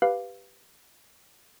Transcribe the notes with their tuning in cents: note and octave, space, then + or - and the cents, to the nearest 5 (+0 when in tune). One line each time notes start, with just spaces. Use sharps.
G4 +0 B4 +0 F5 +0